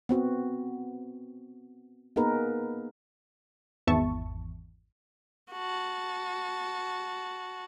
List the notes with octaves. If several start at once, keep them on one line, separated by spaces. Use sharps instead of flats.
B3 C4 F#4
A#3 B3 D#4 G#4 A#4 B4
G#1 E2 E5 A5 C#6
F#4 A5